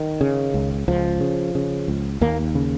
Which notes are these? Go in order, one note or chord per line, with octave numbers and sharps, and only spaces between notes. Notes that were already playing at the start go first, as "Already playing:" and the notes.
Already playing: D#3
C#3
C#2
C#2 F3
C#3
C#3
C#2
D#2 A#3
C#3